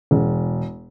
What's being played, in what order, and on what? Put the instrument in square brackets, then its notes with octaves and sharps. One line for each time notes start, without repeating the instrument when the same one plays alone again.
[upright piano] E1